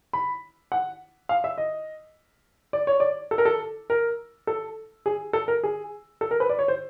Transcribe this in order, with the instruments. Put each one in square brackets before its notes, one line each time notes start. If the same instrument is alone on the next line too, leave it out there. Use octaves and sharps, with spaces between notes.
[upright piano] B5
F#5
F5
E5
D#5
D5
C#5
D5
A4
A#4
A4
A#4
A4
G#4
A4
A#4
G#4
A4
A#4
B4
D5
C#5
C5